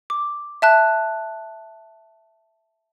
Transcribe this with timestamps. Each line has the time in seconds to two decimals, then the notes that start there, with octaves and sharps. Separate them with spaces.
0.10 D6
0.62 E5 A5 F#6